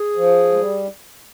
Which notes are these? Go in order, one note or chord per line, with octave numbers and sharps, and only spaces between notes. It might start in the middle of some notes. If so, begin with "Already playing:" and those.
Already playing: G#4
F3
G#3
G3